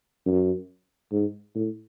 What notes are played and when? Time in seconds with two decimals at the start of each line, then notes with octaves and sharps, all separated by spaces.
0.26 F#2
1.12 G#2
1.55 A2